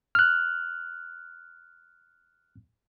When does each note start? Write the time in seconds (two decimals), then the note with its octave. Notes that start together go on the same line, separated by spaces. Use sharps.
0.15 F6 F#6